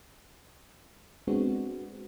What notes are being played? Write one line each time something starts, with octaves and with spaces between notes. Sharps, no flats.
G#3 B3 C4 D4 F#4